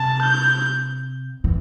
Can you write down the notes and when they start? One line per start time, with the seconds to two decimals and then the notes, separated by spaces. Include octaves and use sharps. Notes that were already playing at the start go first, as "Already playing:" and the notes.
Already playing: C3 A5
0.22 G6
1.44 E3